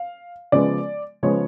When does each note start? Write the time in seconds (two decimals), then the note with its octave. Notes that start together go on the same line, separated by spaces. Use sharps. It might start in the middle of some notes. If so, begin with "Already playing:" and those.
Already playing: F5
0.52 C#3 F3 G#3 B3 D5
1.23 C#3 F3 G#3 B3 C#5